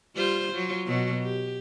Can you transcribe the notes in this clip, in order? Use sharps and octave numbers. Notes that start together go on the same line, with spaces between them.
G3 F4 C5
F#3 F4
B2 F#3
G4